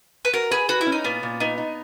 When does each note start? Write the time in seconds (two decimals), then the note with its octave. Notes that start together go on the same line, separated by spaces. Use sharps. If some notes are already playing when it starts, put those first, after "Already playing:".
0.25 B4
0.33 F#4 A#4
0.51 G#4 B4
0.69 F#4 B4
0.81 E4
0.87 C#4
0.92 D#4
1.04 A#2 B3
1.23 A#2
1.40 B3 D#4
1.58 D#4